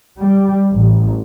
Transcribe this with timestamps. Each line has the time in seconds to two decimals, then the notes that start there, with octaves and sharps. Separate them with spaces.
0.21 G3
0.71 A1